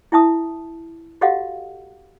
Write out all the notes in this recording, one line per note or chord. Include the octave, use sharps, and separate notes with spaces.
E4 E5 A5 D#6
F#4 G4 A4 D#5 F5 F#5